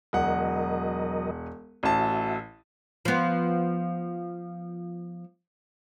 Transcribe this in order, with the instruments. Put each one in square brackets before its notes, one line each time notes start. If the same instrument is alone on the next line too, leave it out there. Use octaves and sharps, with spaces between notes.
[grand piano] E1 F#5 [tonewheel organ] F#3 A#4 D#5
[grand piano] A1 A5 [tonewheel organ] F#4 E5
[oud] F3 B3